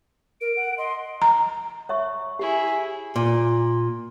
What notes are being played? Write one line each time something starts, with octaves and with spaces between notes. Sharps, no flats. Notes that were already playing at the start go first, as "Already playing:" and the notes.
A#4 D7
F#5
D#5 C6
A#5
C#5 E5 C#6
E4 G4 G#4
A#2